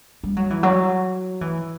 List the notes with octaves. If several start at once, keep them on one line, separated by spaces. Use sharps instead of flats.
G3
F#3
E3
F#3
E3